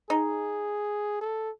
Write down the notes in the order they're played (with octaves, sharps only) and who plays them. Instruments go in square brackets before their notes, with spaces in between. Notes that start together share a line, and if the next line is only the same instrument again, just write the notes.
[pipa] D#4 [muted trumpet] G#4
[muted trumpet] A4